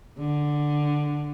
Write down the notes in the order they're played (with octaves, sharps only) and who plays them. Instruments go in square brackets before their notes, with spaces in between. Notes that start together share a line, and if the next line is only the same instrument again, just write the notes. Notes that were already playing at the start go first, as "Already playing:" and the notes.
[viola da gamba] D3